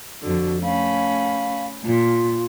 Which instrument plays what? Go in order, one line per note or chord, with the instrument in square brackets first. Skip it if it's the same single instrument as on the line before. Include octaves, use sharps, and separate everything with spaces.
[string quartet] F2 D3 [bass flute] F#4
[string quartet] A3 C#4 B5 [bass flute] F5
[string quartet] A#2 [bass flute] F4